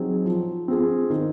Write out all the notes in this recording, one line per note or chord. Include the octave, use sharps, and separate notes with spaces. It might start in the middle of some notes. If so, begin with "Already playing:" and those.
Already playing: F#3 C4 D#4 G#4
F3
C4 F4 G#4
D#3